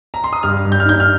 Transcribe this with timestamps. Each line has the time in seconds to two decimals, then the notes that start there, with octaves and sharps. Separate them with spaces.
0.14 A#5
0.24 C6
0.33 D#6
0.43 G2 F6
0.65 G2
0.72 G6
0.80 F6
0.86 D#4 G6
1.00 F6